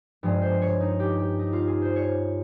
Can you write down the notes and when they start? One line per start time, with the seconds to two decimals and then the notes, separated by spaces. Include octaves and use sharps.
0.23 G2 F3 G#3
0.42 C5
0.62 C#5
0.80 D#4
1.00 G4
1.19 G4
1.39 D#4
1.53 F4
1.67 G#4
1.82 C5
1.96 C#5